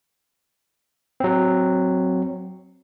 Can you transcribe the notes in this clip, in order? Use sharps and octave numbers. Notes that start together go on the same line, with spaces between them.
F#3 C4